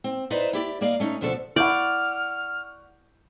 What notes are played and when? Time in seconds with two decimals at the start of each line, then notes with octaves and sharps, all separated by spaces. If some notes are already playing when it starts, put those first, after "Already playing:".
0.04 C4
0.30 D#4 E4 B4 C5 D5 D#5
0.53 E4 G4 D5
0.81 A#3 A#4 D5 D#5 F5
1.00 A3 C#4 D#4
1.21 D2 B2 F3 D4 A4
1.56 E4 D5 F#5 C#6 F6 G6